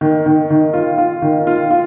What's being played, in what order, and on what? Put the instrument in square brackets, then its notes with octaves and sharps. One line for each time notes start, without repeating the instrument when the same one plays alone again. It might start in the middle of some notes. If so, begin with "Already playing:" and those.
[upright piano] D#3
D#3
D#3
F4
F4
D#3
F4
F4